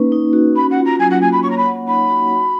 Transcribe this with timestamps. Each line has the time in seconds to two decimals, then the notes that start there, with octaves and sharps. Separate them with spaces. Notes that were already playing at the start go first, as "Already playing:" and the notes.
Already playing: A#3 C#4 D#4 B4
0.12 D#4
0.33 F#4
0.56 C#4 B5
0.70 F#5
0.76 F4
0.85 A#5
0.99 F#3 G#5
1.10 F#5
1.21 A#3 G#5
1.32 B5
1.42 C#5 C#6
1.50 A#5
1.57 B5
1.65 F#5
1.87 D#4 B5
2.09 F#4
2.31 F#4